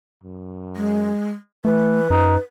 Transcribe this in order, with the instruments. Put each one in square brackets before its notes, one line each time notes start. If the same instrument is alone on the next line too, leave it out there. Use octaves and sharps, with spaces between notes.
[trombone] F#2
[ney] G#3
[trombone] E3 [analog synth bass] A3 [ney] B4
[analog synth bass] F#2 [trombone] D#4